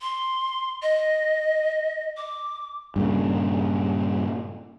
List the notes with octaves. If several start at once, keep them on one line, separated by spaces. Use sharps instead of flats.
C6
D#5
D6
G2 A#2 C#3